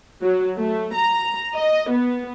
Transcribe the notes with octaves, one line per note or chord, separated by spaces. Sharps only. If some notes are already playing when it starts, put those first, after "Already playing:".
F#3
A3
A#5
D#5
B3